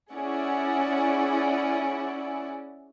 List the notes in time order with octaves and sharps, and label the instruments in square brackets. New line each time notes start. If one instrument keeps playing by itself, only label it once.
[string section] C#4 E4 G#4 D5 F#5